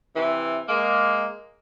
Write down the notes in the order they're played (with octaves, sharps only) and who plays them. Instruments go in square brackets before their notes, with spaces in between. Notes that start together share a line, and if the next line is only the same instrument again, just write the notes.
[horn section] C3 E3
G#3 A#3